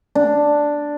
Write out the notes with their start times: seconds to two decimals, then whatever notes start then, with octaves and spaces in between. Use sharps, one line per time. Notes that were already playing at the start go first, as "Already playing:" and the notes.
0.15 D4